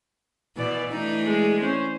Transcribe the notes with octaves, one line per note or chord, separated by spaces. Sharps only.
B2 E3 D5
E3 A3 D4 D#4
G#3 G#4
C#4 C5